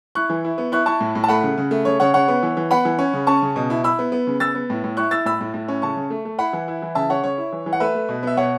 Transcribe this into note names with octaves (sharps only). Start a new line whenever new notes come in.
E4 C#6 F#6
E3
E4
B3
E4 C#6 F#6
E4 A5 C#6
A2
A2
A5
A3 F#5 B5
C#3
C#3
A3
C#3 C#5
C#3 C#5 F#5
C#3 C#5 F#5
B3
E3
E3
B3 F#5 B5
E3
C#4
C#3
C#4 A5 C#6
C#3
B2
E4
E4 B5 E6
B3
B3
C#3
B3 E6 A6
B3
A2
A2
E4 C#6 F#6
E4 E6 A6
A2 B5 E6
A2
A2
C#4
C#3 A5 C#6
C#3
A3
A3
E4 F#5 B5
E3
E4
E3
C#3 E5 A5
C#3 C#5 F#5
C#3 C#5
E4
E3
E3
F#5
A3 B4 E5
A3
B2
B3 E5
B2 C#5 F#5